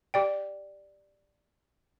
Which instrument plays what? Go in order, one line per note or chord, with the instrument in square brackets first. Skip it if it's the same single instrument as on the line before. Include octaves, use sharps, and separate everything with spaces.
[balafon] G4 D5 G5